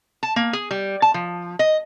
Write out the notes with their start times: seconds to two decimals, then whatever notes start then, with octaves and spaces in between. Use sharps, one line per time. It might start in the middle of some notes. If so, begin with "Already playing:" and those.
0.23 A5
0.36 A#3
0.53 G#4
0.71 G3
1.02 A5
1.14 F3
1.59 D#5